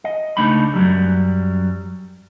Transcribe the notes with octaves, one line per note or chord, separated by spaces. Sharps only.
D#5
C#2 A3 D4 D#4 B5
F#2 F#3 G3